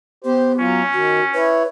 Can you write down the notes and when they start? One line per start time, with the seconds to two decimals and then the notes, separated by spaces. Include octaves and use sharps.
0.24 B3 G4 C5
0.59 F#3 C#4 F4
0.94 D#3 F#4
1.33 E4 B4 C#5